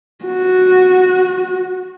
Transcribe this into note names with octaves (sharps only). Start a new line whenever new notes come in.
F#4